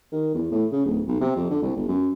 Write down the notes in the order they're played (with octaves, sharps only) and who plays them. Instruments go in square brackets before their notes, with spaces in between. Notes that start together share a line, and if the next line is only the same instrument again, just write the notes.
[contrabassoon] D#3
E2
A2
C#3
D1
B1
C3
F2
D3
C2
G1
F#2